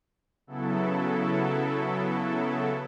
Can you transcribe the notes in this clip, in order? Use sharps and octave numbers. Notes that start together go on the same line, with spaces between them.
C#3 F#3 B3 E4 A4